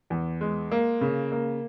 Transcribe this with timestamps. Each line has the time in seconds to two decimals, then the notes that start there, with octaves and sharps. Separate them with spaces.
0.10 E2
0.41 G#3
0.71 A#3
1.01 C#3
1.32 A#3